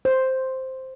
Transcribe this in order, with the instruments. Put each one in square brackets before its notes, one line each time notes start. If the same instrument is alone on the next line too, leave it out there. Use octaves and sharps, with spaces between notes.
[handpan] C5